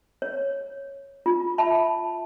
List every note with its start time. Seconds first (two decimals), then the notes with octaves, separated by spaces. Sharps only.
0.22 C#5
1.26 F4
1.58 E5 A5 B5